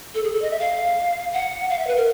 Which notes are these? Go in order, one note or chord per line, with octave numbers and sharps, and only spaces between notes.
A4
G#4
A4
D#5
E5
F5
F#5
F5
E5
B4
A#4